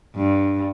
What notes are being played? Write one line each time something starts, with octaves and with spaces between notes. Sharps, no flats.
G2